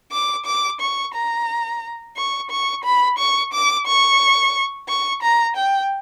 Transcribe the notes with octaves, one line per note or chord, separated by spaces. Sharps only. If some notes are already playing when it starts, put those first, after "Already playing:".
D6
D6
C#6
A#5
C#6
C#6
B5
C#6
D6
C#6
C#6
A#5
G5